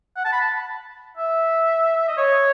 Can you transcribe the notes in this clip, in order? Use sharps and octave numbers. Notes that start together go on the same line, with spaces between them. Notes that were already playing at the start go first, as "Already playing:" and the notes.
F#5
A5
B5
A5
E5
D#5
C#5